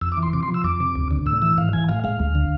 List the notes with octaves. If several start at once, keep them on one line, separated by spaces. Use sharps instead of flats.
F2 E6
D6
E3
C6
C3 D6
C6
F3
E6
F2 D6
C3
D2
D3
A2 E6
E3 E6
G#2 F5
E3 G#5
A2 F5
G#3 F5
D2
D3